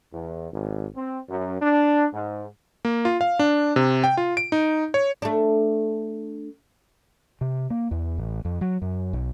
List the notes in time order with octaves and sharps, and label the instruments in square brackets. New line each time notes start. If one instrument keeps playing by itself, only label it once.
[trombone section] E2
G#1
C4
F#2
D4
G#2
[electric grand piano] A#3
F4
F5
D4
C3
G5
F4
D7
D#4
C#5
[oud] A3 D4
[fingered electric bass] C3
A#3
E2
A1
F2
F#3
F#2
B1